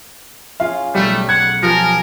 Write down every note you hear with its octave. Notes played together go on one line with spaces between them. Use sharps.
C#4 F4 G#4 F5
B1 F#3 G3 A3
F#5 G#6
F3 G4 A#4 G#5